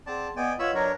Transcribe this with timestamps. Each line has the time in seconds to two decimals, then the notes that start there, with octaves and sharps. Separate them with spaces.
0.07 C4 G#4 D5 F#5 A5 C6
0.37 B3 D5 D#5 G5 G#5
0.59 F4 B4 C#5 D#5 F#5 B5 E6
0.75 F#3 D4 A#4 C#5